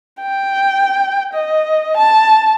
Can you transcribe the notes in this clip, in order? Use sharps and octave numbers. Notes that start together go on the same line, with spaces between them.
G5
D#5
A5